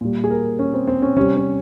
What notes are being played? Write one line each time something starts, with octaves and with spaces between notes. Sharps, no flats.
A#2 G3
G#4
A#4
C#4
C4
C4
C#4
C3 G3 C#4
C#4